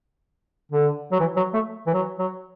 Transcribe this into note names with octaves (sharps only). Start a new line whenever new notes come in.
D3
F#3
E3
F#3
A3
E3
F#3
F#3